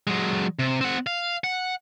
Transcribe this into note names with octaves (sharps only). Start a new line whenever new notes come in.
F#3 G#3
C3
C4 F#5
F5
F#5